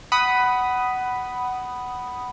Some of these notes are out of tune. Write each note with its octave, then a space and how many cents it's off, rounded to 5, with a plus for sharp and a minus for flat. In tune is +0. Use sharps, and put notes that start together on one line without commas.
F#5 +15 B5 +0 D#6 +0